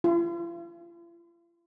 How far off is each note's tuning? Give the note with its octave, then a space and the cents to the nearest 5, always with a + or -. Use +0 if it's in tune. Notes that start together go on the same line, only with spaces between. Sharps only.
F4 -45 C6 +0